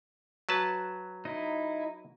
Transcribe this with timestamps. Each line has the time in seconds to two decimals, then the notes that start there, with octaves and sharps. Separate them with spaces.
0.49 F#3 B4 A5
1.25 D#4 E4